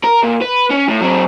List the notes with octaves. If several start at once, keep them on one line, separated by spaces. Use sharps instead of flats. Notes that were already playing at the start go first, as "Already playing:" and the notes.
A#4
A#2
B4
C#4
A2
F#3 C4